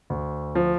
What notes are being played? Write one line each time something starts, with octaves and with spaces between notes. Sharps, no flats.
D2
F3